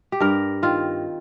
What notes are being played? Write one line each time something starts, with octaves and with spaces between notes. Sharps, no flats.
G4
G2 A#4
D#3 C4 F4